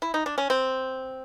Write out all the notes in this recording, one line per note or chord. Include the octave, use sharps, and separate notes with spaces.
E4
D#4
D4
C#4
C4